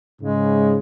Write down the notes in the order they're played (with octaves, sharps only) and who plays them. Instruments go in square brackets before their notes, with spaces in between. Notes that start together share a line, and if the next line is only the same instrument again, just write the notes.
[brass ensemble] G#2 C#3 [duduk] G#3